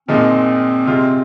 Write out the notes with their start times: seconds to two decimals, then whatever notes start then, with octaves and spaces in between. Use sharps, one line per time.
0.08 A#2 F3 G#3 C4 D#4
0.86 C3 G#3 F4